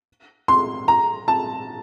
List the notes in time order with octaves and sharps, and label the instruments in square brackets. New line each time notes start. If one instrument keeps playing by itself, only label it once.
[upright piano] C6
A#5
A5